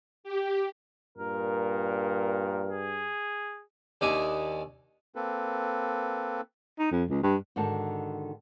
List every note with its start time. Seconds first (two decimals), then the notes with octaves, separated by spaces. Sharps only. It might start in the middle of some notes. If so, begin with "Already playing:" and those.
0.24 G4
1.18 G2 A#2 A#4
2.70 G#4
4.01 D#2 D4 D#4 E5 G#5
5.16 A#3 C4 A4 B4
6.79 D#4
6.92 F2
7.10 C#2
7.23 G2
7.56 G#2 D3 D#3 F#4 A5